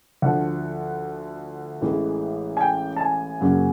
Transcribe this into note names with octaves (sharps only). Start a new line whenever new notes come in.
D2 D3 F3 F#5
A1 A2 E3 G#3
G#5
G5
A5
G#5
F#2 C#3 F#3 A#3